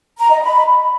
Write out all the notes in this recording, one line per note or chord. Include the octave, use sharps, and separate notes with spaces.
A#5
D#5
B5